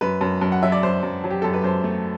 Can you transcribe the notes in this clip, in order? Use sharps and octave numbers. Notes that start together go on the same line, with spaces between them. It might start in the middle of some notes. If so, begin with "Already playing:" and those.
F#2 B4
F#2
F#2
F#5
F#3 E5
D5
F#2 C5
F#2
F#3
G4
F#2 A4
B4
F#2 C5
A3